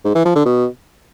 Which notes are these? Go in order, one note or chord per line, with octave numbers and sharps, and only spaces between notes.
G#2
E3
F3
D3
B2